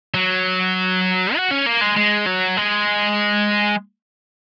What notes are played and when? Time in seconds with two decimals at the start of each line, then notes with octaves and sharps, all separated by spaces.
0.14 F#3
1.36 F#4
1.51 C#4
1.67 A#3
1.81 G#3
1.97 G#3
2.26 F#3
2.57 G#3